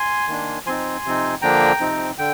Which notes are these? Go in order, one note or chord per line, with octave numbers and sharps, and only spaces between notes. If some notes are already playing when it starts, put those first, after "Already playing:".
Already playing: G#5 C6
D#3 A#3 D4
F3 C4 D#4 G#5 C6
C3 F3 C4 D#4
D3 F3 A#3 D4 G5 A#5
C3 F3 C4 D#4
D3 G5